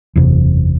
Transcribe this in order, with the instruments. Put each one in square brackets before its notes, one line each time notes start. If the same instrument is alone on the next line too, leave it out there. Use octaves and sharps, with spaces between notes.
[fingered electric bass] F#1 E2 C3